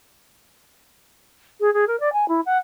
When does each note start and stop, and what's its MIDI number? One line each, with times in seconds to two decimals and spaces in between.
1.60 1.72 68
1.74 1.85 68
1.88 1.99 70
2.00 2.12 74
2.13 2.28 80
2.28 2.41 64
2.46 2.58 78